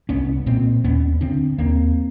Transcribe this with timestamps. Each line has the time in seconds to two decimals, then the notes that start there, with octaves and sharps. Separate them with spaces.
0.09 C2 B3 C#4
0.46 A#2 A#3 C4
0.84 D#2 B3 C#4
1.21 D3 C4 D4
1.58 D#2 A#3 C4